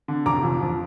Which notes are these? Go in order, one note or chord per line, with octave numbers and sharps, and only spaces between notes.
D3
F1 A#5 D6
F2
F2